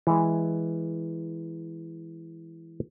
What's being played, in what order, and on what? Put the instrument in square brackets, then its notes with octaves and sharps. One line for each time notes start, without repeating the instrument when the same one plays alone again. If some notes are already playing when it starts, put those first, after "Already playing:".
[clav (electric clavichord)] E3 G#3